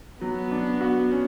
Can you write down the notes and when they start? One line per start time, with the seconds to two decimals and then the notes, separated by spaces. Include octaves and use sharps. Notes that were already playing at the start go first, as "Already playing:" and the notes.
0.21 F#3 B3
0.51 D4
0.81 F#4
1.11 C#4